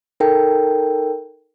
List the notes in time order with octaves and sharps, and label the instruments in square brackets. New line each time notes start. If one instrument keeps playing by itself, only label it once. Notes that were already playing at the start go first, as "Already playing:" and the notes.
[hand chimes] D#4 A4 A#4 G5